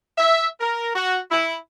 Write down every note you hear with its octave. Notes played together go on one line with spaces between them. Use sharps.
E5
A#4
F#4
E4